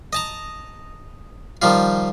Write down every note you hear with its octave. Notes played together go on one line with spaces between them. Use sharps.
D#5 A5 A#5
D#3 F3 G3 F4